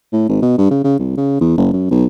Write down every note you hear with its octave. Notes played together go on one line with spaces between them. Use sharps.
A2
G#1
B2
G2
C#3
C#3
C2
C#3
E2
F#1
F#2
B1